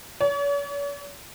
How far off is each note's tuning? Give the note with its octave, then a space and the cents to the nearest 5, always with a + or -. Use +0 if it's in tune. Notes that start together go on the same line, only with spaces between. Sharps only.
C#5 +45